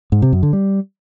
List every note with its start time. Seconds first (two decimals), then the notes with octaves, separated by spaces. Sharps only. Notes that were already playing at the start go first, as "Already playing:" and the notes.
0.12 G#2
0.22 C3
0.33 F#2
0.43 D3
0.53 G3